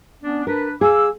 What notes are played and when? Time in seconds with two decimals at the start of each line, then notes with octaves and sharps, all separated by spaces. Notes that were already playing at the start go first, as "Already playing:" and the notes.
0.22 B3 C#4 D4
0.47 D4 A#4 B4
0.81 G#4 F5 D6 E6